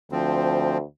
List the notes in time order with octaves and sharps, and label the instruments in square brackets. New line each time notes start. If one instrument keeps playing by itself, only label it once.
[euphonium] D2 [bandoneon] F3 C4